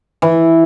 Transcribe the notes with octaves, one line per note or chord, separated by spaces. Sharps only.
E3